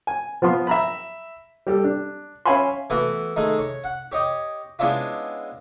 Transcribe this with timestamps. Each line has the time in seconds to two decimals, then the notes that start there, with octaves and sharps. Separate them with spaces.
0.07 G#5
0.42 F3 B3 F4 C6
0.67 E5 A#5 B5
1.67 G3 G4 A4
1.84 D4
2.45 C#4 E5 F5 G#5 B5 C6
2.90 E3 A3 B3 F#4 B4
3.36 D#3 G#3 A3 D#4
3.59 C#5
3.84 F#5
4.12 G4 C#5 D#5 G5
4.79 G#3 B3 C#4 D4 E4 F4